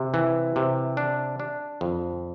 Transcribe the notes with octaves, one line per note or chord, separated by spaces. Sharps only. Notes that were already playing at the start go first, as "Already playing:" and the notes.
Already playing: C3
E3
C3
D4
D4
F2